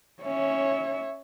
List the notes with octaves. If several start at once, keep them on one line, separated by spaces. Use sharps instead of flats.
C#4 C#5 E5